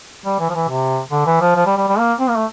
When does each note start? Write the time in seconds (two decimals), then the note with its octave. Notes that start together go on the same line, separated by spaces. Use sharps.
0.26 G3
0.40 E3
0.50 F3
0.55 E3
0.69 C3
1.12 D3
1.26 E3
1.41 F3
1.56 F3
1.66 G3
1.77 G3
1.88 G3
1.99 A#3
2.20 C4
2.29 A#3
2.37 A3